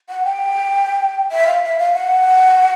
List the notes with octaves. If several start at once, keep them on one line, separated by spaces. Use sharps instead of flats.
F#5
G5
E5
F5
E5
F5
F#5